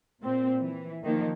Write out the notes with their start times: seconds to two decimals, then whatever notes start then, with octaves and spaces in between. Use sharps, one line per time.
0.22 A#2 C4
0.62 E3
1.03 D#3 F3 A#3